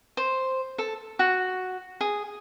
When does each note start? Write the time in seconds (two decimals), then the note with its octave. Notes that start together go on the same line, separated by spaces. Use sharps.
0.17 C5
0.78 A4
1.19 F#4
2.01 G#4